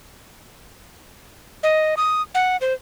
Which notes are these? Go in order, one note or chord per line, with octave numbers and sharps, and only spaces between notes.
D#5
D#6
F#5
C5